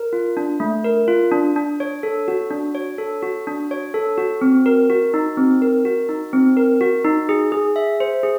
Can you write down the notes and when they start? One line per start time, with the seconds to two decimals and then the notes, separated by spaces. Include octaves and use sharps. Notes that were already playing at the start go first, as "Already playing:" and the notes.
Already playing: A#4
0.13 F4
0.37 D4
0.60 A3
0.84 A#4
1.08 F4
1.32 D4
1.56 D4
1.80 C#5
2.03 A4
2.28 F#4
2.51 D4
2.75 C#5
2.98 A4
3.22 F#4
3.47 D4
3.71 C#5
3.94 A4
4.18 F#4
4.41 C4
4.66 A#4
4.90 F#4
5.14 D#4
5.37 C4
5.62 A#4
5.85 F#4
6.09 D#4
6.33 C4
6.57 A#4
6.81 F#4
7.04 D#4
7.29 G#4
7.52 G#4
7.76 E5
8.00 C5
8.23 G#4